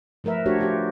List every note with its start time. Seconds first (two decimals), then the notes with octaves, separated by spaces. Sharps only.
0.24 F3 A3 A#4 B4 E5
0.45 A3 D4 F#4 G4 C#5
0.58 A3 F4 G4